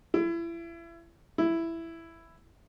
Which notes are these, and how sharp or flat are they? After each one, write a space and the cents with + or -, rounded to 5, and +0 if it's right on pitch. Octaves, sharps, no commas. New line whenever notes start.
E4 +30
E4 +5